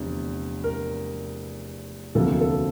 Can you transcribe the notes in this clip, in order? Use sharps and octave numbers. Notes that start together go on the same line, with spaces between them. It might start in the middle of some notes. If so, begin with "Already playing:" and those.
Already playing: F1 E2 D3
A#4
E1 D2 C3 F3 A#3 A4
A4